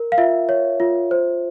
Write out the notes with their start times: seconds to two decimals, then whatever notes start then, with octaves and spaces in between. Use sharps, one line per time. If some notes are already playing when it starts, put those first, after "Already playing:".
Already playing: A#4
0.12 F5
0.18 F4 E5
0.49 C#5
0.80 F4
1.11 C5